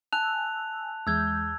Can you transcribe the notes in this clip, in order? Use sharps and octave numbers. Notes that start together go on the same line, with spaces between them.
G#5 A5 E6 F#6 F7
E2 G#3 E6 G6 G#6